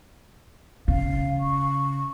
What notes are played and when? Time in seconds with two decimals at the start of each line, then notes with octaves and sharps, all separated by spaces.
0.88 C#3 F5
1.39 C#6